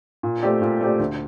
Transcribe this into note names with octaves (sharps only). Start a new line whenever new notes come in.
A#2
A3 C4 G4 D5
A#2
A3 C4 G4 D5
D2